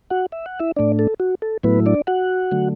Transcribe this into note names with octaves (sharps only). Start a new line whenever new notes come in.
F#4 F#5
E5
F#5
E4 E5
A2 A3 D4 D5
A4
F#4
A4
A2 F#3 A3 B3 E4 B4
D4 D5
F#4 F#5
D3 F#3 A3